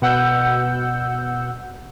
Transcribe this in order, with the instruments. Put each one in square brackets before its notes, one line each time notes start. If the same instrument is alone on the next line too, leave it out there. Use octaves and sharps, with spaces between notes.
[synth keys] B2 F#5 E6 G6